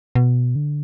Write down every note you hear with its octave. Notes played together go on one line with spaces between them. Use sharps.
B2
D3